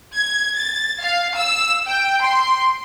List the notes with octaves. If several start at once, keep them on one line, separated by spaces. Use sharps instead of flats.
G#6
A6
F5
E6
G5
C6